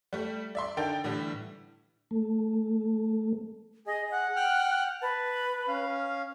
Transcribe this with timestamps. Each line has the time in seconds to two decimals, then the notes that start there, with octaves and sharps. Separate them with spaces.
0.13 G3 A3
0.55 D5 E5 C6
0.77 D3 D#4 A4 A#4 G5 A6
1.04 A2 D3 E3 G3
2.11 A3
3.87 G#4 D#5
4.11 F#5
4.36 G5 F6 F#6
5.02 B4 A5
5.68 C#4 F5